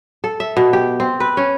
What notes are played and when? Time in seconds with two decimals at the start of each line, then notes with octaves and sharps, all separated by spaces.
0.24 A4
0.40 E5
0.57 B2
0.73 G4
1.00 C4
1.20 B4
1.37 C#4